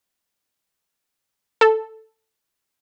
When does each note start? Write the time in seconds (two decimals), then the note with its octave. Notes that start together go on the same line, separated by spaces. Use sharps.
1.61 A4